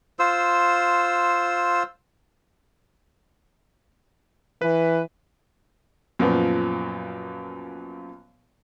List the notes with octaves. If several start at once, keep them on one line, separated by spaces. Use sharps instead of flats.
F4 C5 E6
E3 B4
F#2 A#2 F3 B3